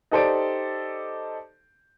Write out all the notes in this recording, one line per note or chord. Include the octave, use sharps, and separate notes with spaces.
D#4 G4 A4 C5 D5 D7